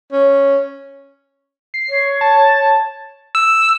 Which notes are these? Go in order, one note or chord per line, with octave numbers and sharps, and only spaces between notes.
C#4
C7
C#5
A5
E6